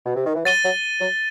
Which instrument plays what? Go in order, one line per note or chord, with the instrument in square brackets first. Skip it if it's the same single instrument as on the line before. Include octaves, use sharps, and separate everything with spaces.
[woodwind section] B2
C3
D#3
E3
[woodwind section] F#3 [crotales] A6 D#7 G7
[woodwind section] F#3
F#3